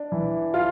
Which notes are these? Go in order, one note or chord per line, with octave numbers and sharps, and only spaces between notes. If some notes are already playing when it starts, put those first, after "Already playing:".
Already playing: D4
E3
F4